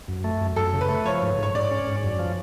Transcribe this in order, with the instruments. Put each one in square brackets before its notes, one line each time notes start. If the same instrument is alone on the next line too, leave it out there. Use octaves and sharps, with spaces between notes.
[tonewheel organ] F#2
A3
F#2
[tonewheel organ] F#2 [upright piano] A4
[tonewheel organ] C#3
[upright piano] B4
[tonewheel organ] A3
[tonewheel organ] F3 [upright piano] C#5
[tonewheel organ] G#2
G#2
[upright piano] C#5
[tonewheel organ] G#2 [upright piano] D5
[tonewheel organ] C#4
G#2
F#2
F3